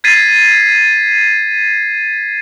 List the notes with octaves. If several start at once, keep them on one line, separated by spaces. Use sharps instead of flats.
G#6 A6 B6 C7 D#7